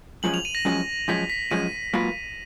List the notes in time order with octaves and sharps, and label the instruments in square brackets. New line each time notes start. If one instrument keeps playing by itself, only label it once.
[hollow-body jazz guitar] F#2 F3 G#3 C#4 [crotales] F#7
[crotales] F7
D#7
A#6
[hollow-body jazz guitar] F#2 F3 G#3 C#4
[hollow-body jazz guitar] F#2 F3 G#3 C#4 [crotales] B6
[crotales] B6
[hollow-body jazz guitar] F#2 F3 G#3 C#4 [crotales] D#7
[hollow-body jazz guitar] G#2 F#3 A#3 F4 B4